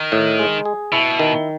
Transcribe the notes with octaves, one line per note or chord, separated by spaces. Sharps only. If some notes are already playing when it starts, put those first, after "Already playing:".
Already playing: D#3
A2
G#3
G#4
B2 E4
D#3